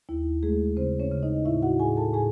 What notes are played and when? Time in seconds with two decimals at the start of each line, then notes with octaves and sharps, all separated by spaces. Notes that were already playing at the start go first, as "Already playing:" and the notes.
0.09 D#2 E4
0.43 G#3 A3 G#4
0.77 C#3 C4 C5
0.99 C#4 C#5
1.11 C#3
1.23 D#4 D#5
1.45 A2 E4 E5
1.62 F#4 F#5
1.80 A2 G#4 G#5
1.96 A4 A5
2.14 A2 G#4 G#5